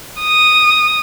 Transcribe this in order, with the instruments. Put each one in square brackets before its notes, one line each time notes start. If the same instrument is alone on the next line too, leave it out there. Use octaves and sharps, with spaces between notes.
[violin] D#6